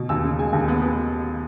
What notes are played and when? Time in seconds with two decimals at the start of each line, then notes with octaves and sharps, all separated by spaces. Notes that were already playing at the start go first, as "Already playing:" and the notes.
Already playing: B2
0.09 D#2 E6
0.23 C#3
0.39 G#3 G#5
0.53 D#2
0.68 B3
0.82 B3